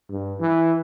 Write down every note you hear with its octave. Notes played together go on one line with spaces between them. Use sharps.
G2
E3